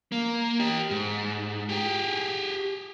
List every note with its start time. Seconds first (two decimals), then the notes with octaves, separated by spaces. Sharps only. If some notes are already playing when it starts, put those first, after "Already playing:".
0.12 A#3
0.60 G4 D#5
0.91 G#2
1.69 G4 G#4